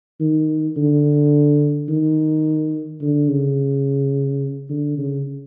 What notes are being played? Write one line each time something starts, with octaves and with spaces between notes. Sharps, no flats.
D#3
D3
D#3
D3
C#3
D3
C#3